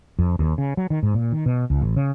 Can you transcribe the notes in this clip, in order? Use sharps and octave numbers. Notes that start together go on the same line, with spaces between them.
F2
D#2
C#3
F#3
D#3
G#2
A#2
D#3
B2
C#2
A1
C#3